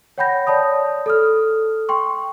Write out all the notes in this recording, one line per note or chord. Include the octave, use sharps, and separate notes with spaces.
C#5 F#5 G5 B5 G6 A#6
C#5 D5 A5 B5 D#6
A4 D#6 F6
G5 C6 C#6